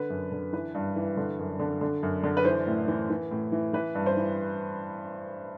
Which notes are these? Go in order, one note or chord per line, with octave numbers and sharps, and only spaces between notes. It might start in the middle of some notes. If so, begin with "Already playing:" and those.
Already playing: D3 B4
F#2
D3
E3 B4
G2
E3
D3
F#2
D3
D3
F#2
D3
B4
E3 C5
A2
E3
E3
A2
E3
E3 B4
G2
C5
E3